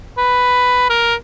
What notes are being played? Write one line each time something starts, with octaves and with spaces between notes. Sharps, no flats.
B4
A#4